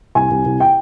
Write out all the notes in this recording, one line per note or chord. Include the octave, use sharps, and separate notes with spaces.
C2 G#5
C2
C2
G5